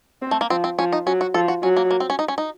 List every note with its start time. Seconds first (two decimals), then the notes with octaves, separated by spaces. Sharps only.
0.22 C4
0.31 A3
0.41 A#3
0.50 F3 C4
0.64 C4
0.78 F3 C#4
0.93 D#4
1.07 F#3 C#4
1.21 F#4
1.34 F3 A4
1.48 F#4
1.63 F#3 C#4
1.77 A#3
1.91 A#3
2.00 C4
2.10 C#4
2.19 D#4
2.28 C#4
2.38 D#4